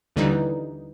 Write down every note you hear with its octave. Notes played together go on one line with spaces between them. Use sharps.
D#2 D3 E3 G3 D#4